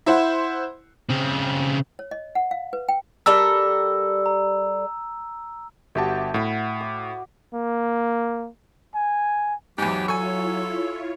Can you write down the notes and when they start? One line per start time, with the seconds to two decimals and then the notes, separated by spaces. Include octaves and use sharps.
0.06 E4 C5 F#5
1.09 C#3 C4
1.99 C#5
2.11 D#5
2.35 F#5
2.51 F5
2.73 B4
2.89 G5
3.26 G3 A4 A#4 E6
4.26 A#5
5.95 G1 F#4 G4 E5 A5
6.34 A2 F#5 B5
6.80 D6
7.54 A#3
8.95 G#5
9.78 E2 G#2 F#3 G4
10.08 E4 F4 A4 C#5 G#5 C#6